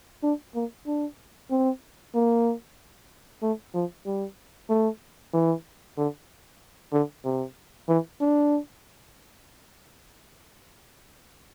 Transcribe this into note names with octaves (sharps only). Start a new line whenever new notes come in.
D4
A#3
D4
C4
A#3
A3
F3
G3
A3
E3
D3
D3
C3
E3
D4